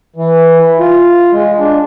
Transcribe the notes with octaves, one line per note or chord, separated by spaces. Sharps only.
E3
F4
G#3
D4